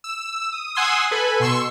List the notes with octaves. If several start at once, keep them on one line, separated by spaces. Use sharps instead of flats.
E6
D#6
F#5 G#5 C6 D#6 E6
A4 B4 G#5 B5
B2 C6 C#6 E6